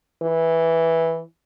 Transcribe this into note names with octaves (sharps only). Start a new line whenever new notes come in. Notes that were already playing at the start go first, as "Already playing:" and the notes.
E3